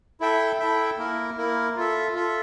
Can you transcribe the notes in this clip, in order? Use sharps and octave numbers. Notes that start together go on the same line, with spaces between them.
E4 A4 E5 G5
E4 A4 E5 G5
A#3 E4 A#4
A#3 E4 A#4
F4 A4 E5
F4 A4 E5